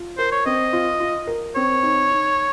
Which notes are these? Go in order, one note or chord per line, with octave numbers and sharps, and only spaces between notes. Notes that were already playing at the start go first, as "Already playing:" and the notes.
Already playing: F4
A#4 C5
C#5
C4 D#5
F4
F4
A#4
C4 C#5
D#4
D#4